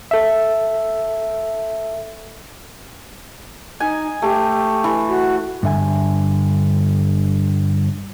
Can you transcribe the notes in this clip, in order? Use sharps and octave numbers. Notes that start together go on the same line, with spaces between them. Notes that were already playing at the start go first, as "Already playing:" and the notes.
A4 E5
D#4 G#5
A3 G4
E3
F#4
G2 D3 E5 G#5